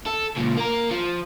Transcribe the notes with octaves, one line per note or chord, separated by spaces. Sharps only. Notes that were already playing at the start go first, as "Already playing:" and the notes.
A4
C#2 A#2
A#3 A#4
F3